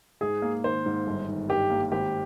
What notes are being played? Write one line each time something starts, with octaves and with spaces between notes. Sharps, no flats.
G#2 G#4
A#3
D#3 C5
G#2
G1
D#3
G2 G4
A#3
G#1 G4